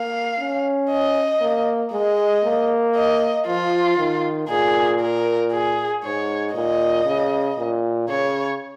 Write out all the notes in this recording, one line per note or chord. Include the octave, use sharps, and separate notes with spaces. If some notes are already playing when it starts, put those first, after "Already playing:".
Already playing: A#3 F5
C#4
D#5
A#3
G#3 D#5
A#3
D#5
F3 F4
D#3
A#2 G#4
A#4
G#4
G#2 C#5
A#2 D#5
C#3
A#2
C#3 C#5